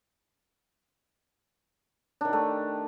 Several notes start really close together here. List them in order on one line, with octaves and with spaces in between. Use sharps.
D4 D#3 G4 A3